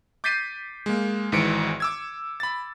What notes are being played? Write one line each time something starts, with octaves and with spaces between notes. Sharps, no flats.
D6 G6 A6 B6 C7 D#7
G#3 A#3
G#1 G#2 E3 C#7 D7
D6 E6 G#6
B5 A6